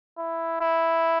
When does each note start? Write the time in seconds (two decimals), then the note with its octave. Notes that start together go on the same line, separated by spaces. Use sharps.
0.18 E4
0.61 E4